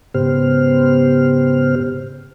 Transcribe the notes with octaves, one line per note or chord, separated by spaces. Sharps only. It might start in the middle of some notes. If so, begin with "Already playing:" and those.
G#2 C#3 B3 G4 C5 F6